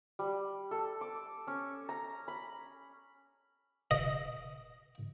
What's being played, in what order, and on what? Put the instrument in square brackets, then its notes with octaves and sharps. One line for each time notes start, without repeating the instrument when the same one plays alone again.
[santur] G3
A4
D6
C#4
A#5
B5
[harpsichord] D#5